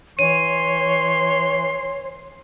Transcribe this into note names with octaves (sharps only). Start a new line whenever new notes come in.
E3 C#5 C6 D#7